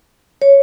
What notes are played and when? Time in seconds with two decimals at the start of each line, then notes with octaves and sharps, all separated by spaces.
0.42 C#5